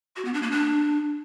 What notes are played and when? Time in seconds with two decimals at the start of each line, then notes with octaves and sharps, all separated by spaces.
0.16 F#4
0.25 B3
0.34 D4
0.42 A#3
0.51 D4